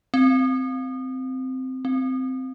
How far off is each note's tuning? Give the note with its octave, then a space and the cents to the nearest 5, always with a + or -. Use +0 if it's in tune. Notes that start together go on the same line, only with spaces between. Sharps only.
C4 -10
C4 -10